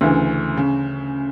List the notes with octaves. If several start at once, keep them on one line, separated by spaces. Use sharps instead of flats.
D2 C#3 E3
C#3